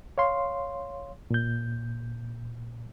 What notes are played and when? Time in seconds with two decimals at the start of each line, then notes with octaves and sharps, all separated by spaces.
0.18 C#5 F5 C6
1.31 A#2 G6